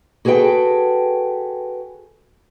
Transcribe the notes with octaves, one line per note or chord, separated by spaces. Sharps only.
F#4 G#4 A4 B4 G5